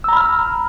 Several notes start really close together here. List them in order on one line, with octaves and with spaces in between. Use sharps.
E6 A#5 B5 F6